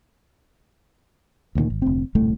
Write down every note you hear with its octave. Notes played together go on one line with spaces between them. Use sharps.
D2 G2 A#2 D#3
G#1
F1 D2 C4
D#1 C2 A2 A3